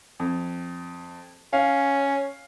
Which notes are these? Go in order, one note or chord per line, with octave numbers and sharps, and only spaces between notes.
F2
C#4 F5